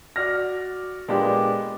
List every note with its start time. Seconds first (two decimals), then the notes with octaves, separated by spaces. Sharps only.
0.16 F#4 D5 F6 A#6
1.08 A#2 G#3 B3 D4 G4